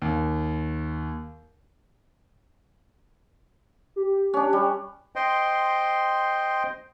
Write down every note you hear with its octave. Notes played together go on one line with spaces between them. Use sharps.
D#2
G4
C#4 D4
G3
C5 D#5 G5 C6